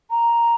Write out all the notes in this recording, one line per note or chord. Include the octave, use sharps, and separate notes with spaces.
A#5